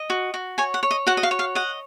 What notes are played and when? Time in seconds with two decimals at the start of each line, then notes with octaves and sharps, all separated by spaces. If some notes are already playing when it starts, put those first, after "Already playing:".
Already playing: D#5
0.10 F#4
0.34 F#4
0.58 C#5 G#5
0.74 F#5
0.83 C#5
0.91 D#5
1.07 F#4 F#5
1.17 D#5
1.23 F5
1.31 C#5
1.39 F5
1.55 D#5 F#5